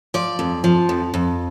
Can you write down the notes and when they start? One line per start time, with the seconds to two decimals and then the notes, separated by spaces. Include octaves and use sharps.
0.14 F3 D5
0.39 F2
0.64 F3
0.89 F2
1.14 F2